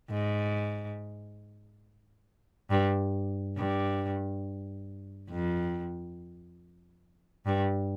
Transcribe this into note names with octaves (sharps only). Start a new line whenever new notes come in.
G#2
G2
G2
F2
G2